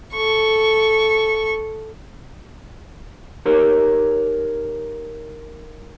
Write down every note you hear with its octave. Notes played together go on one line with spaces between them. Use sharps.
A4 C#6
D#4 G4 A#4 C#5